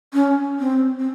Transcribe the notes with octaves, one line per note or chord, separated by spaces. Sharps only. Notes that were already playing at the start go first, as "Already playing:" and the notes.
C#4
C4
C4